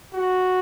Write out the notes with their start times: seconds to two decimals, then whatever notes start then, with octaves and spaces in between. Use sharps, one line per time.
0.14 F#4